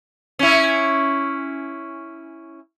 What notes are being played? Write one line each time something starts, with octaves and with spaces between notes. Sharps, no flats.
C#4 E4